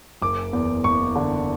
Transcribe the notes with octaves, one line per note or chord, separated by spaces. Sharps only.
F#1 D6
E2
F#1 C#6
D3